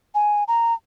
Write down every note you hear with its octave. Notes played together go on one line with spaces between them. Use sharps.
G#5
A#5